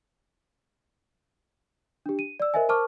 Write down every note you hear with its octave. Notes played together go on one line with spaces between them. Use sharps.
D4 G4
D#7
D5 E6
A#4 C5 D#5 E5 G#5
A#4 C5 A5 C#6 D6 F6